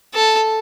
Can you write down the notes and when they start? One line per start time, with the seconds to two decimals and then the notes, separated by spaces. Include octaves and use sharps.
0.14 A4